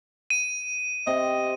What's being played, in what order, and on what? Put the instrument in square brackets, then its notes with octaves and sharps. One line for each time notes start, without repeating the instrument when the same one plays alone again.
[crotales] D#7
[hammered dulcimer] C3 [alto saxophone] D#5